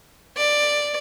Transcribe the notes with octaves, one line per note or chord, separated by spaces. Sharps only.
D5